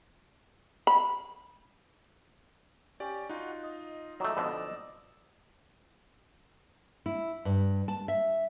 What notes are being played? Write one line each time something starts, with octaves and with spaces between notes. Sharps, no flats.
B5
C#4 G4 D5
D#4 F4 F#4 F#5
D#5
F#3 A3 D5 D#5 E6
F2 B2 D3
E4
G2
A5
E5